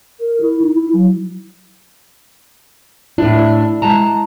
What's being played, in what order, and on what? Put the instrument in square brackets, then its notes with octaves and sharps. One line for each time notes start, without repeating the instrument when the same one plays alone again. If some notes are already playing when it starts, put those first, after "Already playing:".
[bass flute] A#4
E4
D#4
E4
F#3
[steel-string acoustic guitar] A2 D4 [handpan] E4
[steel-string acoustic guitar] G#3 A5 A#5